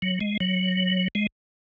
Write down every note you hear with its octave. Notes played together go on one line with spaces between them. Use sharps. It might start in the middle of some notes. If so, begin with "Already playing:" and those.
F#3
G#3
F#3
G#3